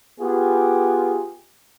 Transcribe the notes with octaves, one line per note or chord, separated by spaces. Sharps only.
B3 F4 G4 G#4